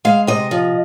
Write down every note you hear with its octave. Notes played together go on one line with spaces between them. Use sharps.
G#3 F5
C3 D#5
F3